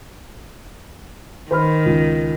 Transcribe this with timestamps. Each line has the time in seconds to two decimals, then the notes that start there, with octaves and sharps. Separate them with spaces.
1.51 D#3 C5 B5 F6
1.86 C#2